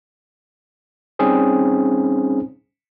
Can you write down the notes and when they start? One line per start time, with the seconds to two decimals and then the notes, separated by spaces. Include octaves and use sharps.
1.19 G3 C4 C#4 D#4 G#4 C5